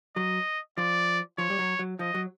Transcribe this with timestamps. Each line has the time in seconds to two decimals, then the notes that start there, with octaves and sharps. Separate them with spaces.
0.16 F#3 D#5
0.78 F3 D5
1.38 F3 C#5
1.50 G3
1.59 F#3
1.79 F#3
1.99 F3 D#5
2.14 F#3